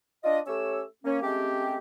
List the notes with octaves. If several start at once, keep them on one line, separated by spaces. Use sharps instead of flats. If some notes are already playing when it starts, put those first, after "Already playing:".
D4 F4 D5 D#5
A3 C#4 G4 C#5 E6
A#3 C#4
G#3 A3 C4 C#4 G4